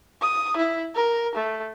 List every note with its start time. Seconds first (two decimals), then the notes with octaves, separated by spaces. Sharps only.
0.21 D#6
0.57 E4
0.95 A#4
1.35 A3